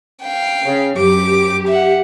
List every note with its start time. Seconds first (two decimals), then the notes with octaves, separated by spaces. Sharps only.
0.24 F5 G5
0.64 C#3
0.96 F#2 G4 D6
1.68 E5 F#5